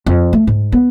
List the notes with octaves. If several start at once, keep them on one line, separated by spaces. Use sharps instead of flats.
F2
A3
G#2
B3